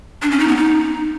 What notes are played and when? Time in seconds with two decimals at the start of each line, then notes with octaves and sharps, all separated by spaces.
0.22 D4
0.31 C#4
0.40 D#4
0.48 B3
0.57 D#4